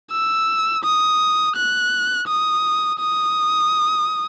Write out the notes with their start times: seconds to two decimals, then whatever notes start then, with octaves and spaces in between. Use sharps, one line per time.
0.12 E6
0.84 D#6
1.56 F#6
2.28 D#6
3.00 D#6